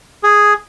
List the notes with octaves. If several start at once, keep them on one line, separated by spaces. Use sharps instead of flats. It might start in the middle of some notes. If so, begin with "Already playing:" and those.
G#4